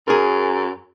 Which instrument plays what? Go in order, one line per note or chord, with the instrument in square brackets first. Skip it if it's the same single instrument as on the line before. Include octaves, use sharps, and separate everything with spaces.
[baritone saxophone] F#2 [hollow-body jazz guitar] G#4 A#4